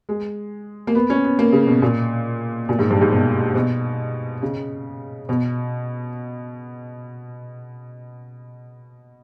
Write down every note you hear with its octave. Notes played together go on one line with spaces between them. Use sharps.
G#3
A#3
B3
C#4
B3
A#3
C#3
B2
A#2
A#2
G#2
G2
G#2
B2
B2
C#3
B2